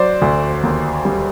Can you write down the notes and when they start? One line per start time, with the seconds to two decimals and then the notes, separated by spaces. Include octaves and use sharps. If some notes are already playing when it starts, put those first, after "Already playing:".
Already playing: F#3 C5 D5
0.22 D2
0.63 D#2
1.05 G3